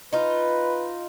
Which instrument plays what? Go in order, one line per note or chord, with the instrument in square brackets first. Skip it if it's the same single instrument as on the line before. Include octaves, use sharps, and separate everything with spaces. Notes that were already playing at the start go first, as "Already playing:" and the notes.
[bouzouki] D#4 F4 [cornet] B4